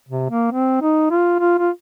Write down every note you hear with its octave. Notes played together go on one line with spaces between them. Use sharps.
C3
A#3
C4
D#4
F4
F4
F4